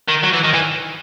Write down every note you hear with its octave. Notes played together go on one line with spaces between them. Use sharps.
D#3
F#3
E3
D#3
E3